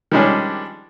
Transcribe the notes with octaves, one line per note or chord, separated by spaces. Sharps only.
D#3 F3 G3 G#3 C#4 D4